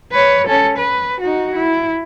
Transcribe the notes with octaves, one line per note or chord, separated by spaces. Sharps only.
B4 C#5
C#4 A4
B4
D#4 F#4
E4